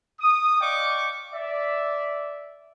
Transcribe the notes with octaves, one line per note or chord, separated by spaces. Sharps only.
D#6
D5 D#5 F5 G5 C#6 D6
D5 E5